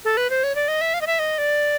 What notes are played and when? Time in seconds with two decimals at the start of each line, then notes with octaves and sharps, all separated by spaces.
0.05 A4
0.17 B4
0.30 C5
0.44 C#5
0.55 D5
0.68 D#5
0.81 E5
0.94 F5
1.01 D#5
1.07 E5
1.19 D#5
1.38 D5